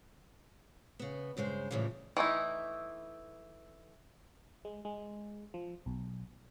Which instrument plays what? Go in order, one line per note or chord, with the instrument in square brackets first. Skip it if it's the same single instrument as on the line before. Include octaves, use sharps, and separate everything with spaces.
[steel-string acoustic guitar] C#3 B3
G2 C#3 G#3 C5
A2 C#3 E3 F3 G3
[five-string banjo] E3 A3 D#4 E4
[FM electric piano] G#3
G#3
F3
B1